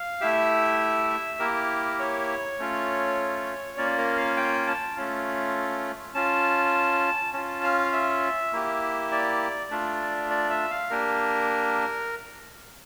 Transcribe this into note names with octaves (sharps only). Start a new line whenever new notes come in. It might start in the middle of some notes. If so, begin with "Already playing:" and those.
Already playing: F5
A3 E4 G4 E5
A#3 E4 G4 A#4
C#5
A3 C#4 F4
A#3 C#4 F4 D5
A#4
F5
G5
A5
A3 C#4 F4
C#4 F4 A5
C#4 F4 A5
F5
E5
A#3 E4 G4
D5
A3 D4 F4
D5
E5
F5
A#3 D4 G4 A#4